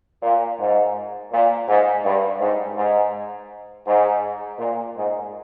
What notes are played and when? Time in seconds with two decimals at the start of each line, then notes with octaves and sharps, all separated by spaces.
0.23 A#2
0.59 G#2
1.32 A#2
1.68 G#2
2.04 G2
2.41 G#2
2.77 G#2
3.86 G#2
4.59 A#2
4.95 G#2